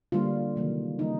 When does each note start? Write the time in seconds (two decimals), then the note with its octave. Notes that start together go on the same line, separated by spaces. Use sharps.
0.12 D3 G3 A#3 F4
0.56 C3 D#3 F#3 A#3
0.99 C#3 E3 G3 A#3 D#4